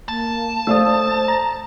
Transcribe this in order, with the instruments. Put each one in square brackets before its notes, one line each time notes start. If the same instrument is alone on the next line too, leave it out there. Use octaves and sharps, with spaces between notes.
[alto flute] A#3 [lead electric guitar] A5
[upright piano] A3 D5 F5 [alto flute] C5 [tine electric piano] D#6 E6
[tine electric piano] A#5